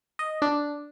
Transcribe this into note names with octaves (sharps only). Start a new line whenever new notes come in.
D#5
D4